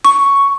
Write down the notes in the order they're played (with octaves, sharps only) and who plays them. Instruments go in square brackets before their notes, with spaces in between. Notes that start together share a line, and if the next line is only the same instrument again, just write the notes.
[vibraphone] C#6